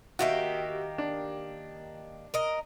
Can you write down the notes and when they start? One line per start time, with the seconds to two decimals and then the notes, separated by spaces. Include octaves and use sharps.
0.19 D#3 A#3 F#4 G4 E5
0.98 D4
2.34 A#4 D#5